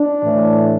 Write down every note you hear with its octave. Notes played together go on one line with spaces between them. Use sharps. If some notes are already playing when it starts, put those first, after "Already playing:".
Already playing: D4
A2 E3 A3